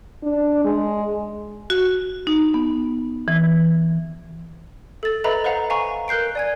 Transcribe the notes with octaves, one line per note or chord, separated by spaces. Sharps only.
D4
G#3
F#4
D#4
B3
E3
A4 A6
A4 B4 D#5 E5 A#5 B5
B4 C5 F5 F#5 A#5
F5 G#5 A#5 C#6
A#4 F#6 G6 C7 D7
D5 G#5 G#6